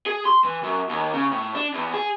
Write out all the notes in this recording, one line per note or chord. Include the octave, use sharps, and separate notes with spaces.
G#4
C6
E3
F#2
D#2
C#3
A2
D4
E2
G#4